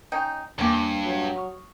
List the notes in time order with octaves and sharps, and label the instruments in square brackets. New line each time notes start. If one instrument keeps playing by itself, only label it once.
[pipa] C#4 D#4 G5
[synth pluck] E2 A#3 [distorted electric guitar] G2 [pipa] C#4 G4
[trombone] F#3
[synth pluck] C#6 D#6 F6